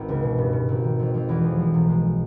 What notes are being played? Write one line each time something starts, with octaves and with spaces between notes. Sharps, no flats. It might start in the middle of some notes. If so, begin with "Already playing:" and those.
Already playing: G#1 B3
C#2
B2
G2
G2
G#1
D#3
F2
F2
E2
F3
F3
B1
G#3